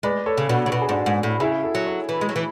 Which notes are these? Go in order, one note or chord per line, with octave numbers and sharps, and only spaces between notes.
G#3 B4 D5
A4 C#5
C#3
B2 D4 F#4
C#3
B2 F#4
G#4
G#2 D4 F#4
G#2
A2
C#3 E4 G#4
F#4 A4
F#3
A4 C#5
E3
G#3
F#3
E3